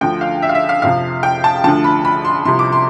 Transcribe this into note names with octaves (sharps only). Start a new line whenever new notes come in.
D2 D3 F3 G5
F5
E5
F5
E5
F5
F2 C3 F3 F5
G5
A5
D2 D3 F3 A5
B5
B5
C6
C2 C3 F3 C6
D6
C6